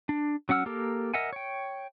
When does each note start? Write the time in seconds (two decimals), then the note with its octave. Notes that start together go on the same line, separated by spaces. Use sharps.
0.09 D4
0.49 F#3 C#4 F#5 E6 F6
0.66 A#3 G4 A4 A#4
1.14 A#4 D#5 E5 F#5 G#5
1.33 C#5 G5